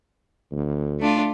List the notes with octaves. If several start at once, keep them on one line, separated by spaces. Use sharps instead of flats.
D2
A3 D4 F4